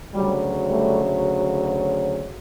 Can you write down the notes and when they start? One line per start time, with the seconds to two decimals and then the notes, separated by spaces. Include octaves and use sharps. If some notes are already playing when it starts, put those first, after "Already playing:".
0.15 D2 C#3 F#3 G3
0.69 G3 A3